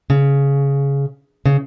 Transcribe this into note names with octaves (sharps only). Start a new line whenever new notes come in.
C#3
C#3